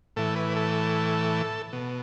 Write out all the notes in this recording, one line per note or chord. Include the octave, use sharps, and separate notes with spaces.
A2 E3 A4
B4
A4
B2